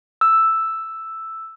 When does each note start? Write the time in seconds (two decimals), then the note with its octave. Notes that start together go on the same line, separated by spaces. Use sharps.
0.21 E6